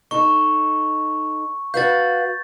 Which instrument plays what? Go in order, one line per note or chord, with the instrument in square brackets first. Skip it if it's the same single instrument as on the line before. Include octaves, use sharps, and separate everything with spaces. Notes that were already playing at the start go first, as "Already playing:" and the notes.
[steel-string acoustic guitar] D#4 A4 [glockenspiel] C#6
[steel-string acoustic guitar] F#4 B4 F5 [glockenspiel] G6 A6